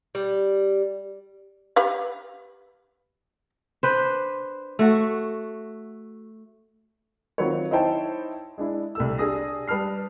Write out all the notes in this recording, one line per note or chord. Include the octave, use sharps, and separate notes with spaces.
G3
G4 B4 F5
D4 B4 C5
A3 F#4
D#3 F#3 C4 F4 B4 C#5
D#4 E4 C5 C#5 G5 A5
G#3 D4 E4
C2 A4 E6
D4 G4 G#4 D#6 A#6
G3 B4 A5 F6 C7